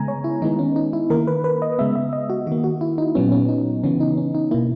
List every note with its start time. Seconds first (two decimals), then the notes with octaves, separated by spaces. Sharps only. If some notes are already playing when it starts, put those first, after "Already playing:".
Already playing: C#3 G#3 B3 G#5 A#5
0.08 C#5
0.24 E4
0.42 D#3 G#3 B3 D#4
0.59 C#4
0.76 D#4
0.93 E4
1.10 D#3 A#3 A#4
1.28 B4
1.44 B4
1.62 D#5
1.79 C#3 G#3 B3 E5
1.95 E5
2.13 D#5
2.30 F#4
2.47 D#3 A#3 F#4
2.64 F#4
2.81 E4
2.98 D#4
3.15 A#2 F#3 B3 C#4
3.32 C#4
3.49 D#4
3.84 C#3 E3 B3 C#4
4.00 D#4
4.17 C#4
4.35 D#4
4.51 B2 A#3 E4